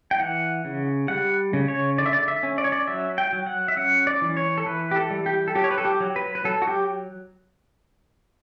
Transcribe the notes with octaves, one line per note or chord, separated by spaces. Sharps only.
G5
E3 F#5
C#3
G3 F#5
C#3
C#5
D3 D5
E5
D5
E5
C#4
D5
C#5
D5
F#3 E5
G5
F#3
F#5
E5
C#4 F#5
D5
E3
C#5
A4
E3 B4
G4
A4
G3
G4
A4
F#3 G4
C#5
B4
A4
G4
F#3
B4
B4
F#3 A4
F#4
G4